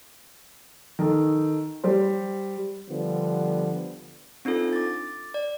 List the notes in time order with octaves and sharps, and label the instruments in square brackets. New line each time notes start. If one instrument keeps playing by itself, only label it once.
[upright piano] D#3 A4
G3 C5
[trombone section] D3 F3 G3 B3
[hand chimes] C4 D4 D#4 F4 A4
D6 A6
D5